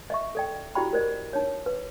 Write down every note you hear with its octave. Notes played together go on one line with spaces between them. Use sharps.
D#5 E5 C#6
A4 D5 G5
E4 F#4 G4 D5 G5 B5
A#4 C5 D5 D#5
D#4 C#5
B4